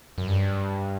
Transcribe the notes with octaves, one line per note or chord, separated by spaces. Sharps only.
F#2
G2